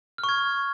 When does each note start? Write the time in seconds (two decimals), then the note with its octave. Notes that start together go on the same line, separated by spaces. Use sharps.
0.18 F6
0.24 C#6
0.29 G#6